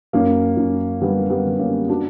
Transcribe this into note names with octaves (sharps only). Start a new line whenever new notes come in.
F#2 A#3 C#4
F#2
D3 G3 B3
G3 B3
D3
A#3 C#4
D4 F#4